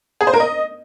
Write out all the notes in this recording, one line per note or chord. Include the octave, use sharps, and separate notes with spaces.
G#4
C5
A#4
D#5